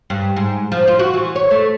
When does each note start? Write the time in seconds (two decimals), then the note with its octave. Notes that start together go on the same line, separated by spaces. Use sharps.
0.10 G2
0.36 G#2
0.72 F3
0.88 F4
0.99 F#4
1.14 E3
1.36 C#5
1.51 A3